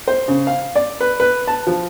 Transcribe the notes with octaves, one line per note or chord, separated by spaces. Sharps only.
C5
C#3
F5
D5
B4
B4
A5
F3